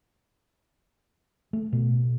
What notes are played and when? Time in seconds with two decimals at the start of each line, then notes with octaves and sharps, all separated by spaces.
1.53 A3
1.73 B2